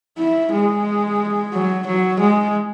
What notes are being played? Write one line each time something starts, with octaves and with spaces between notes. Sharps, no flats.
E4
G#3
F#3
F#3
G#3